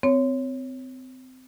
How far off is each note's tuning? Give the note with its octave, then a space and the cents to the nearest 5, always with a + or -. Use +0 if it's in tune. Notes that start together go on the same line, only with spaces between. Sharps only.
C4 -25 C#5 +0